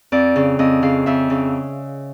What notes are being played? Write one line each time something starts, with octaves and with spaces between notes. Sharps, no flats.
F2 D5
C#3
F2 D#5
C#3 F5
F2 E5
C#3